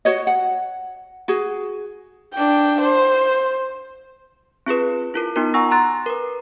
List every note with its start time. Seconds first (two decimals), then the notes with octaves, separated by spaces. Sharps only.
0.05 F#4 C#5 D#5
0.27 F#5
1.28 F#4 G#4
2.34 D4 G5
2.81 C5
4.66 C4 F4 G#4 B4
5.14 E4 F4 A#4
5.36 B3 D#4 F4 F#4 A#4
5.54 F#5 G#5 A#5 C#6 E6 A#6
5.71 A#5 C6 F#6 A6
6.06 A#4 B4